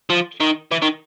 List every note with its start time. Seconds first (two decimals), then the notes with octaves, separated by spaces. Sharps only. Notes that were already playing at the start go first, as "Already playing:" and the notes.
0.10 F3
0.41 D#3
0.71 E3
0.82 D#3